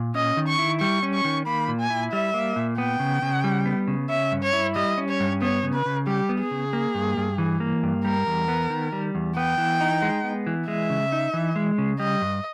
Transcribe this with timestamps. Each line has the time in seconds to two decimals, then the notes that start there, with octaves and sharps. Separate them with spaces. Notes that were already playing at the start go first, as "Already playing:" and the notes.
Already playing: A#2
0.15 C#4 D#5
0.37 D#3
0.48 C#6
0.59 E4
0.80 G3 C#6
1.03 C#4
1.14 C#6
1.25 D#3
1.46 A#3 B5
1.68 A#2
1.80 G#5
1.90 E4
2.12 G3 E5
2.34 A#3
2.56 A#2
2.78 B3 G5
3.00 C#3
3.22 C#3
3.44 G3
3.66 B3
3.88 C#3
4.09 C#4 E5
4.32 G2
4.43 C#5
4.53 E4
4.75 G3 D#5
4.98 C#4
5.09 C#5
5.20 G2
5.42 B3 C#5
5.63 C#3
5.74 B4
5.86 C#3
6.07 G3 G4
6.29 B3
6.40 G#4
6.51 C#3
6.73 A#3
6.95 G2
7.17 G2
7.38 E3
7.60 A#3
7.83 G2
8.05 G3 A#4
8.27 E2
8.48 B3
8.70 D#3
8.92 G3
9.15 E2
9.37 B3 G5
9.58 E3
9.81 D#4
10.02 G#3
10.24 B3
10.47 E3
10.68 G#3 E5
10.90 C#3
11.12 D#4
11.34 E3
11.56 G#3
11.78 C#3
12.00 G3 D#5
12.22 G2